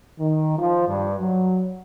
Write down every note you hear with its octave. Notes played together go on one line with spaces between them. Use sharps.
D#3
F3
G2
F#3